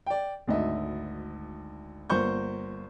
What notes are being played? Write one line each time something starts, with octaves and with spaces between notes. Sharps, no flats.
D5 G5
G#1 D2 D#4 D#5 E5
G1 A#3 F4 C5 C#6 G6